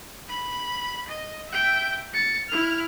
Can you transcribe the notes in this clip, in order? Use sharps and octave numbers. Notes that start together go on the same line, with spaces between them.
B5
D#5
E5 G5
A6 C#7
E4 F6